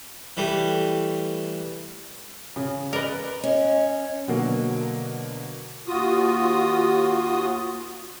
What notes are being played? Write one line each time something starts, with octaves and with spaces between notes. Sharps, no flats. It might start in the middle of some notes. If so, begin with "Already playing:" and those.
E3 G3 A3
C#3
A#4 B4 D5 D#5
C#4 D#5
B2 D3 F#3 A#3
D#2 F4 F#4 D#6